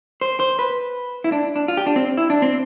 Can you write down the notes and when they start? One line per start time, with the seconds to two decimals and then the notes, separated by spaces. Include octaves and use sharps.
0.21 C5
0.40 C5
0.59 B4
1.24 E4
1.32 D4
1.56 D4
1.68 F4
1.77 G4
1.86 D4
1.96 C4
2.17 E4
2.30 D4
2.42 C4